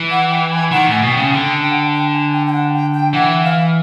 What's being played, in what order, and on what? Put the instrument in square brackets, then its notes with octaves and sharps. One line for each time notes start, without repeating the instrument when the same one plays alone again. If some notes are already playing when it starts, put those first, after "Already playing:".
Already playing: [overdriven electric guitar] E3
[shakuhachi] F#5
G5
G#5
[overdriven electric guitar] D#3 [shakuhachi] F#5
[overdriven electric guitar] A2 [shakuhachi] G#5
[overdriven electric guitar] B2 [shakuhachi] G#5
[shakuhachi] G5
[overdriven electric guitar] C#3
[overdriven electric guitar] D3 [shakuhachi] G5
[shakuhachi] G5
F#5
G5
G5
G#5
G5
G5
F#5
G5
G5
[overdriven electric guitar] E3 [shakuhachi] F#5
[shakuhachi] F5